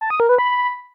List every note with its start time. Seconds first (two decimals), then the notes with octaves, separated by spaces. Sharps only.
0.01 A5
0.10 D#6
0.20 A#4
0.29 B4
0.38 B5